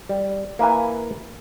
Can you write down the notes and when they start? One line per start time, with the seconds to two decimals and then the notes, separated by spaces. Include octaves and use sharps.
0.09 G3
0.59 A#3 E4 B4 G#5